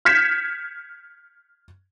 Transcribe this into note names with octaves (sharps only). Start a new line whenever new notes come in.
F6 G6 G#6 B6 C#7 E7